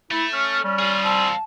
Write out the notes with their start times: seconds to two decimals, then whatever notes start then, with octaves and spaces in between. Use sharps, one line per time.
0.11 A3 E4
0.33 C#4 F6
0.64 G3 C#4
0.79 F4 G#4
1.04 C4 A5